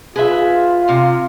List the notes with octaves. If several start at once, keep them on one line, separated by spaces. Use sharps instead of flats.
F4 G#4 B4 E5
C3 F5